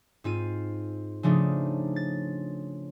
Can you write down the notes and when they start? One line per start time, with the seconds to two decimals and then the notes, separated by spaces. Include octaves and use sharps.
0.24 G#2 C4 F4 D#7
1.23 C#3 F3 A3 D4 D#4
1.96 A6